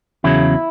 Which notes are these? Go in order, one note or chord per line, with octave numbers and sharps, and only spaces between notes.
E2 C#3 F#3 E4